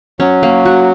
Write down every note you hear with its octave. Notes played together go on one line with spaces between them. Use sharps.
F#3 C#4
A#3
F#4